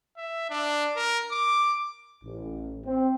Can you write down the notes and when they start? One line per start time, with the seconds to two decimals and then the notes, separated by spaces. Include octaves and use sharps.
0.17 E5
0.50 D4
0.96 A#4
1.31 D6
2.23 A1
2.85 C4